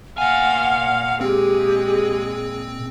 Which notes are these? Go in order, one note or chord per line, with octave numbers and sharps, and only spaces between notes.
A#2 F5 F#5 G#5
G#3 C4 G4 G#4